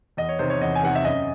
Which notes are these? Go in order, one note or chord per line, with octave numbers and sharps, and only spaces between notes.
E2 D#5
C#5
C3 D#3 C5
C#5
E2 D#5
G#5
C3 D#3 F#5
E5
F#2 D#5